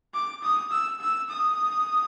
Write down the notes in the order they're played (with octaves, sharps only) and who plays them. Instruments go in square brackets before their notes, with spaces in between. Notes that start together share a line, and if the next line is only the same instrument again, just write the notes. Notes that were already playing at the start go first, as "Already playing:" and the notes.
[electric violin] D6
D#6
E6
E6
D#6